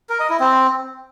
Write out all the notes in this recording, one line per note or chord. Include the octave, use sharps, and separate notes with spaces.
A#4
D#5
E4
C4